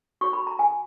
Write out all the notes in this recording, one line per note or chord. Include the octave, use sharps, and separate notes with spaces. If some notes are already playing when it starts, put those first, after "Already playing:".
F#4 C#5 C#6
B5
A#5
G#5